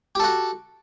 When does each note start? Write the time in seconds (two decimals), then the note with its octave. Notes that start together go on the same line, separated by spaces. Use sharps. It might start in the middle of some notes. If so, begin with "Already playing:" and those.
0.15 G4
0.20 A4
0.24 F#4